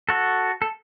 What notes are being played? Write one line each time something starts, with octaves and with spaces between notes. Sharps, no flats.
F#4 A4
A4